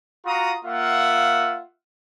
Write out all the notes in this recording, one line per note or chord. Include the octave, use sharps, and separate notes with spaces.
F4 F#4 A#5 D#6
A#3 F4 E5 F#5